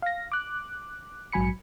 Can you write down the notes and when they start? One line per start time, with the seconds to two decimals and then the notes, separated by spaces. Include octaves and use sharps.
0.02 F5 A#6
0.32 D6 F#6
1.32 A#1 G#2 F#3 G#5 B5 C#7